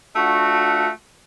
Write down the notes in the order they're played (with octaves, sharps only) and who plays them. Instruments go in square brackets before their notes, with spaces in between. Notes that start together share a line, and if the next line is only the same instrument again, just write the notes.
[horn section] A3 D4 F4 F#4